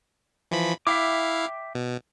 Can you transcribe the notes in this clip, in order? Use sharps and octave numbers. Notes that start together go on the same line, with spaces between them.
E3 F3 B5
E4 E5 F5 G5 D6
B2